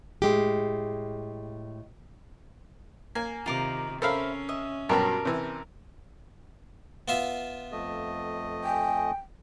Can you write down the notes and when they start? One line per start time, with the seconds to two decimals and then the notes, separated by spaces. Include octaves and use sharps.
0.22 A2 G#3 G4
3.15 A#3 G#5
3.46 C3 D#3 F4 A#4 D6
4.02 C#4 A4 A#4 C5 E5 F5 B5
4.49 D#5 E5
4.89 G2 B2 F#3 G4 A#4 A5
5.25 C3 E3
7.08 B3 F4 E5
7.72 F2 A3 D#5
8.64 G5 G#5